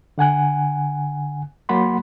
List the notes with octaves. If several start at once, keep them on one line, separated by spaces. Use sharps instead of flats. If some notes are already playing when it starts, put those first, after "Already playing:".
D3 F#5 G#5 F#6
F#3 A#3 F#5 B5 C6